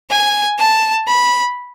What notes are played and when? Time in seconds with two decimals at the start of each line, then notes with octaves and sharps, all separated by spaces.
0.10 G#5
0.59 A5
1.07 B5